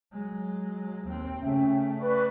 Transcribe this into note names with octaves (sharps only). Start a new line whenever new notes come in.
F#3 G#3
D#2 C4
C#3 A3 C#4 E5 G5
B4 D5 C#6